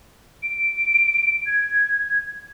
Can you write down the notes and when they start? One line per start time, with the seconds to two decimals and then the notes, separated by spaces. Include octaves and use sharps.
0.43 D7
1.46 G#6